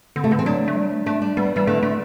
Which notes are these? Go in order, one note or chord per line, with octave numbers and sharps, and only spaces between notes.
D3 C4
C3 A3
D3 B3
E3 C4
F#3 D4
A3
G3
A3
A3 D4
G3 D4
G3 B3
E3 G3
D3 A3
D3 A3